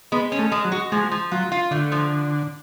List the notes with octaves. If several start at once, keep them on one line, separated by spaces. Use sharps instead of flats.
G#3 B3
C#4
A3
G#3
F#3
F#4
F3 G#3
F3
F#3 F4
F4
D3 A3
F3